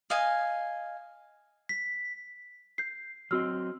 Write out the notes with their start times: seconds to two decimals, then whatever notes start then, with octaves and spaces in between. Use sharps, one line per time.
0.10 D#5 F5 G#5
1.69 B6
2.78 G6 C7
3.31 F#3 C4 F#4 D#5 E6 F6